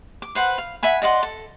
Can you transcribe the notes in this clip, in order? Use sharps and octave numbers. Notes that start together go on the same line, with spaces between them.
D6
B4 C5 F#5
F5
E5 F#5 G#5 B5
D5 D#5 F#5 C6
A4